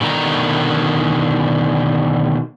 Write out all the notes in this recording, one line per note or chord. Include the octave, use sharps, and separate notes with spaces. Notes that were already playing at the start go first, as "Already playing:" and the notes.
B2 D3 D#3 A#5